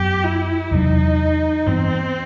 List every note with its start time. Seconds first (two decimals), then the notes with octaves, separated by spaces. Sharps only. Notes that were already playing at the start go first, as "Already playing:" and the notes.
Already playing: F#2 F#3 B3 G4
0.24 E4
0.71 E2 C3 F#3 D#4
1.67 G2 E3 B3 C4